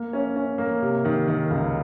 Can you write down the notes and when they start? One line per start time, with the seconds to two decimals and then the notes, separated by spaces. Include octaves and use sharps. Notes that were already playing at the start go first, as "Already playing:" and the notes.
Already playing: A#3
0.13 C#4
0.36 C#4
0.58 A#3
0.82 C3
1.05 D#3
1.27 D#3
1.50 C#2